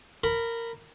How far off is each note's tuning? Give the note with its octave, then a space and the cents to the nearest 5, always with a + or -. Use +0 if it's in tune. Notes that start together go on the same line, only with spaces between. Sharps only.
A#4 -15 B5 +0